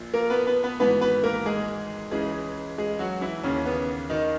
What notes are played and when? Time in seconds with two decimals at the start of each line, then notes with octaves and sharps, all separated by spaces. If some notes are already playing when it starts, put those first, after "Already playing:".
Already playing: A#1 A#2
0.14 A#3 A#4
0.30 B3 B4
0.47 B3 B4
0.63 B3 B4
0.80 G#1 G#2 E3 B3 B4
1.01 B3 B4
1.24 A#3 A#4
1.46 G#3 G#4
2.11 C#2 C#3 E3 G#3 G#4
2.78 G#3 G#4
2.99 F#3 F#4
3.21 E3 E4
3.43 D#2 C#3 E3 C#4
3.66 B3
4.10 D#3 D#4